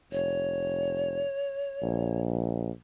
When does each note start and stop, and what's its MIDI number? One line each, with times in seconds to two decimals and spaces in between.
0.11 1.22 29
0.11 2.19 73
1.82 2.70 34